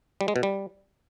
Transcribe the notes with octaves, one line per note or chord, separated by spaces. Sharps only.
G3
G#3
B2
G3